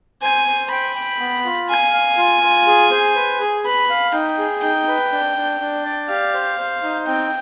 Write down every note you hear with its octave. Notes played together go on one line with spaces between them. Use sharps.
C5 G#5
C5
G5 B5
G5
B3
F4
F5 G#5
F5
F4
F4
G#4
C5
B4
G#4
B4 B5
F5
D#4 G5
G#4
D#4 G5
B4
D4
D4
D4
D5
G4 F5
C5
C5
D#4
C4 G5